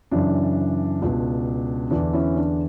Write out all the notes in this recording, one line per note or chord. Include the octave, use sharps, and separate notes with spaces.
F#2 C#3 E3 D4
C#2 B2
E2 D3 D4
C#4 E4
D4